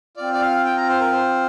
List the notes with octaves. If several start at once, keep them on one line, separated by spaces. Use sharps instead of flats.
C4 F4 D5
D5
F5
G5
A#5
C5
A#4
C5